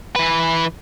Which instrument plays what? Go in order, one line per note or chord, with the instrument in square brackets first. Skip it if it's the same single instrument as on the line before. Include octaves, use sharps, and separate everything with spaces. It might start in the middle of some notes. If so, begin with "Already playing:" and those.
[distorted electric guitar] E3 B4